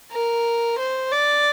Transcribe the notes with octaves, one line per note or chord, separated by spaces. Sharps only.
A#4
C5
D5